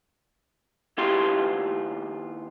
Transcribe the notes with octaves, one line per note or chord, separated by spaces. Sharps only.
D#2 E4 F4 G4 C6